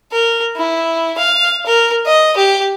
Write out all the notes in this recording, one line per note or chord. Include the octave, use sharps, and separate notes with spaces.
A#4
E4
F5
A#4
D#5
G4